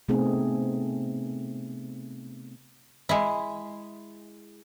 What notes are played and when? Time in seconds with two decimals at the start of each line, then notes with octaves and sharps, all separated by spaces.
0.08 C3 A3 B3 C4 D#4 G#4
3.09 G#3 E4